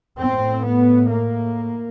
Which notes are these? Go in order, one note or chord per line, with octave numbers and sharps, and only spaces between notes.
A2 C4
B3
A#3